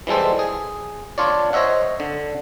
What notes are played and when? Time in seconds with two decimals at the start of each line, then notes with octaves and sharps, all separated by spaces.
0.07 E3 G3 G#3 A4 C5
0.39 G#4
1.18 D4 F4 C#5 D5
1.53 C5 C#5 D#5 E5 F#5
2.00 D3